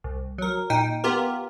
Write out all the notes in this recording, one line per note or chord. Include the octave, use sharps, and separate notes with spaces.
C2
F#3 A#4
A#2 D#4 G5
B3 F4 G4 A#4